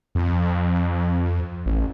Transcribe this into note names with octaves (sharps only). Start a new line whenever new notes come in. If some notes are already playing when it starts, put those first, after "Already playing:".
F2
A1